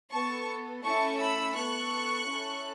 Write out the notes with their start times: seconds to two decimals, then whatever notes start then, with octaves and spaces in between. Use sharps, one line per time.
0.12 B3 A4 A5 C#6
0.83 A3 C#4 E4 A4 A5 C#6
1.19 B5 E6
1.55 B3 A4 C#6 F#6
2.26 C#4 E4 A4